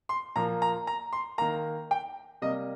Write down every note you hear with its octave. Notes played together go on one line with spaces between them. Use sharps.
C6
A#2 F3 A#3 A#5
A#5
A#5
C6
D#3 A#3 A#5
G5
C3 G3 A#3 D#5